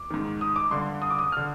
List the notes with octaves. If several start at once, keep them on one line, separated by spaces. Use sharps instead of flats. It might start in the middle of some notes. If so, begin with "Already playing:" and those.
Already playing: D6
G#2 D#3
D#6
D6
G2 D3 C6
D#6
D6
D#6
D3 F6